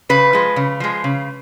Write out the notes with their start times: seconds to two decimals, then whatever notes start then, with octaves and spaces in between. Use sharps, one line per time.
0.09 C#3 B4
0.33 F3 G#3
0.56 C#3
0.80 F3 G#3
1.04 C#3